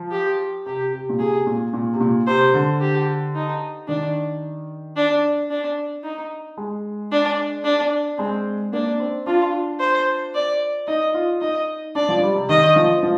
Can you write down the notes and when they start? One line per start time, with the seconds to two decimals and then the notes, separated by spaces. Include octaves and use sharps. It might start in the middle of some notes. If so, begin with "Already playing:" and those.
Already playing: F3
0.11 G4
0.66 C3 G4
0.93 C3
1.09 A#2
1.19 C3 G#4
1.47 A#2
1.73 A#2
1.94 C3
2.00 A#2
2.27 C3 C5
2.54 D3
2.80 G4
3.35 D#4
3.88 D#3 D4
4.96 D4
5.50 D4
6.04 D#4
6.57 G#3
7.12 D4
7.64 D4
8.18 G#3 C4
8.73 A#3 D4
9.00 C4
9.27 D4 F4
9.80 C5
10.34 D5
10.88 D#4 D#5
11.14 F4
11.41 D#4 D#5
11.95 D4 D5
12.09 F3
12.22 G3
12.36 C3
12.49 D#3 D#5
12.76 F3
13.03 F3